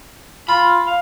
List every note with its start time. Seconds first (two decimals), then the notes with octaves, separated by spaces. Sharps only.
0.48 F4 B5
0.87 F5